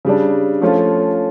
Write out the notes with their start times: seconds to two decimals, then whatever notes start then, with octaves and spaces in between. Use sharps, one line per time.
0.05 C#3 G3 D4
0.61 F3 A3 C#4 F4